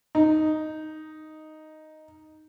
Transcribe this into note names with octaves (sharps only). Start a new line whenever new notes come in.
D#4